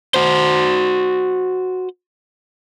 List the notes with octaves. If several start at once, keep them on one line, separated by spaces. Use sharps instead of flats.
F#4 C5